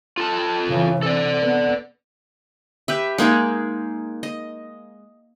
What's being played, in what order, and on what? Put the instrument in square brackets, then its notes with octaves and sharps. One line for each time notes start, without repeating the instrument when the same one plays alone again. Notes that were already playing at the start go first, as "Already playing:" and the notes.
[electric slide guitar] F4 A4 A5
[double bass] C#3 E3
[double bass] C3 [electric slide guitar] A4 D5
[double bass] B3
[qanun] G4 B4 E5
G#3 A#3 D#4 G#4
D#5